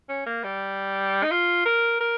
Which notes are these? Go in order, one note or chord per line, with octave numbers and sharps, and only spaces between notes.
C#4
A#3
G3
D#4
F4
A#4
A#4